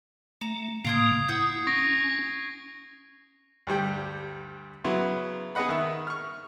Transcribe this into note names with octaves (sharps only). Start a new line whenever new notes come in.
A3 A#5
A2 C#3 A#3 F5 C6 D#6 G#6 C7
E4 F#5 D#6 G6
C#4 C#6 A#6 D7
D2 G2 G3 G5
C#3 F#3 B3 E4 C6
B3 G#4 B4 D#5 F#5 B5
D#3 E5
C#6 F6